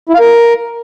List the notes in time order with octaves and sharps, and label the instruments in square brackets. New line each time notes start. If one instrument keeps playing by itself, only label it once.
[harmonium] E4
F5
A#4